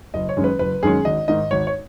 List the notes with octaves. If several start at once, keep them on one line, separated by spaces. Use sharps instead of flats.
F#1 D#5
C#5
F#2 D#3 G#3 C#4
B4
F#1 B4
F#2 D#3 G#3 C#4 G#4
G#1 D#5
G#2 D#3 D#5
G#1 C#5
C#5